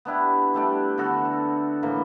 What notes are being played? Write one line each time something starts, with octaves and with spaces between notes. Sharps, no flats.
B3 D4 E4 G4
G3 A3 D4
D3 B3 F#4 A4
A4
A2 E3 A#3